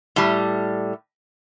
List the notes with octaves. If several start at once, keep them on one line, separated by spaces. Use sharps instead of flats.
A2 G3